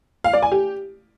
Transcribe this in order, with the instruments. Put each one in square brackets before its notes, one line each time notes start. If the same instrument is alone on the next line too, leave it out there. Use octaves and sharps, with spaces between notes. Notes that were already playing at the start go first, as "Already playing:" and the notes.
[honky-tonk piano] F5
D5
G#5
G4